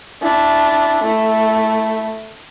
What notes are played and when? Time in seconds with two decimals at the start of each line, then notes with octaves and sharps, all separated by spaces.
0.22 D4 E4
1.03 A3 E4